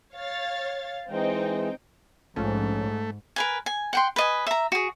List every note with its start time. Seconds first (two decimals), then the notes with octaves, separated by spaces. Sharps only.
0.16 C#5 F5 A6
1.09 E3 G#3 C4 D#4 G5
2.36 A#1 G#2 F3 A3 C#4
3.36 A#4 B4 G#5
3.66 G#5
3.93 F#5 G5 C6
4.16 B4 D#5 G#5
4.47 E5 A#5
4.72 F#4 G#4